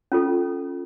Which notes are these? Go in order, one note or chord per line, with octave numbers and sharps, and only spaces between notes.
C#4 F4 A4